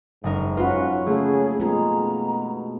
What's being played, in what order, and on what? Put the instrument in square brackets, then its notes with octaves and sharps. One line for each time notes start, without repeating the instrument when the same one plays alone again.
[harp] F#1 D#4 A#4 [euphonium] G#2
[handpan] C#4 F#4 B4 [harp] F4
[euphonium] C#3 [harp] A3 A#3 [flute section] G#4
[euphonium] B2 [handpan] G#3 F4 G#4 [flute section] A#5